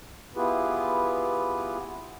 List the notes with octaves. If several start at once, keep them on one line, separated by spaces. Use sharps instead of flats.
B3 E4 F4 G4 G#4 B4